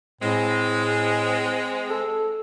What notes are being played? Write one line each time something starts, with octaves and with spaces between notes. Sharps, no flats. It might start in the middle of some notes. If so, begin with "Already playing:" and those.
A2 G#3 C4
A4